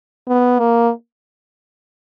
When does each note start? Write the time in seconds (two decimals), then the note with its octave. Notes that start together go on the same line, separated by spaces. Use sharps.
0.28 B3
0.59 A#3